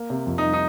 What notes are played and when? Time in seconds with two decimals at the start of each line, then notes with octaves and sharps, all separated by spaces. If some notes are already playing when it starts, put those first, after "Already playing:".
Already playing: A#3
0.10 C3
0.27 F2
0.38 D#4
0.43 G3
0.53 D#4